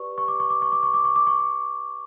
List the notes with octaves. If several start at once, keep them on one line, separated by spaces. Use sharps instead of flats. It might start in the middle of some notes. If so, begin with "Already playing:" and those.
Already playing: G4 B4 D5 C#6
C#6
D6
C#6
D6
C#6
D6
C#6
D6
C#6
D6
C#6